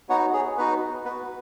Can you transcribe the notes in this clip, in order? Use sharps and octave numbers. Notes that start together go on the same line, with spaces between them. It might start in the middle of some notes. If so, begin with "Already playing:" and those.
B3 D#4 F#4 C#5 F#5
G#4 C#5
B3 D#4 F#4 B4
B3 B4
F#4